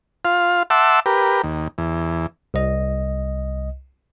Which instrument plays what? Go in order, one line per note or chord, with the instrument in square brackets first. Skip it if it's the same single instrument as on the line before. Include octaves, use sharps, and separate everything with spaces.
[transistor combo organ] F4 F5
E5 F#5 A5 C6 D6 E6
G4 A#4 B4
D#2
E2
[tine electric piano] C2 D#5